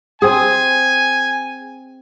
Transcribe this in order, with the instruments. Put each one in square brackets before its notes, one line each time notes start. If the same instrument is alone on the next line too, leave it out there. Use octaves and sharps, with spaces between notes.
[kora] C4 G#4 [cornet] G#5